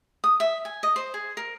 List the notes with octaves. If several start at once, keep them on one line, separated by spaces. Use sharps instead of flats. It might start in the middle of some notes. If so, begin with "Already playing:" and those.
D#6
E5
G#5
D#5
C5
G#4
A#4